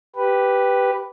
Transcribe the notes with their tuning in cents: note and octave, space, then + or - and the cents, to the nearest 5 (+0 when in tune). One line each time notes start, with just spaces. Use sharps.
G4 +0 B4 +0